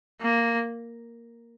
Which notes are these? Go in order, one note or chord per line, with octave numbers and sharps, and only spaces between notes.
A#3